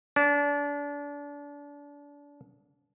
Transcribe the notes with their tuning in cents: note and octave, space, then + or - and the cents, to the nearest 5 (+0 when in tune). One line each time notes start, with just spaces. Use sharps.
D4 -30